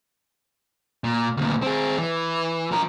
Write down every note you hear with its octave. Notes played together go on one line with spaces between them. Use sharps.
A#2
D2 A#2
C4 G#4
E3
F3 A#4